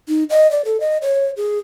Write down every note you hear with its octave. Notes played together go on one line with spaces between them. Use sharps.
D#4
D#5
D5
A4
D#5
C#5
G#4